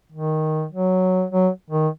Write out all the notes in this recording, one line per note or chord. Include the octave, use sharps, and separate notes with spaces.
D#3
F#3
F#3
D#3